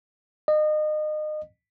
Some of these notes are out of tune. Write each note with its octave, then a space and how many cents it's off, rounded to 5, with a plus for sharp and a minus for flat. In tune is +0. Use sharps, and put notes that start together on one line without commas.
D#5 -30